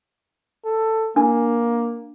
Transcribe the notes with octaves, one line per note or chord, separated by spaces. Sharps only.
A4
A#3 D4